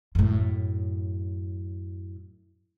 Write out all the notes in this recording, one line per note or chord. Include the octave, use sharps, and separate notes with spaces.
F#2 A2